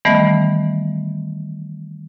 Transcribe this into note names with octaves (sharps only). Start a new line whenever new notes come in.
D#3 E3 G3 A3 B3